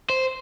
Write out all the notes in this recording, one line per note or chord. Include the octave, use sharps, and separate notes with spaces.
C5